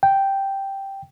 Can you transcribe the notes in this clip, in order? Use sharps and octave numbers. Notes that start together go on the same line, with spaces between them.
G5